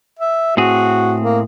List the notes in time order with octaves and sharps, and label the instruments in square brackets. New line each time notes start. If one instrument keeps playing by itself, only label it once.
[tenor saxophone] E5
[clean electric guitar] A2 C4 G#4 [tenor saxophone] F#4
[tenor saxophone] A#3